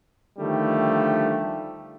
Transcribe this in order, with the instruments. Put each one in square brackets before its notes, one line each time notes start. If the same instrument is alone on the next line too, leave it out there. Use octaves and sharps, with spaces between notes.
[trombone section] D3 D#3 F3 G3 A3